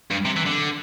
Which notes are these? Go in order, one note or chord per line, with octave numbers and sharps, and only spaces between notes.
G2
C3
E3
D3